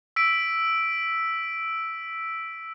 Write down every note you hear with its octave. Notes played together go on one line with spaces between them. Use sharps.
E6 B6 D7